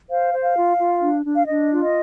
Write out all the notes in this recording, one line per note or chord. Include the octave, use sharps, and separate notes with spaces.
C5 F5
C5
F5
F4
F4
D4
D4
F5
D4 D#5
F4
D#5